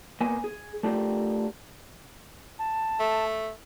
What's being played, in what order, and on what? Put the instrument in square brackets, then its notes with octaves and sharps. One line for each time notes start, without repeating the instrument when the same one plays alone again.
[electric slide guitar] A#3 B3 B4 G#5
G#4
A3 D4 F4 G4 A#4
[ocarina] A5
[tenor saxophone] A3